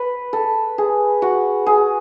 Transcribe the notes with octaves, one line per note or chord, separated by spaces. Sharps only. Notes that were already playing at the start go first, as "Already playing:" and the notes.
Already playing: B4
A4
G#4
F#4
G#4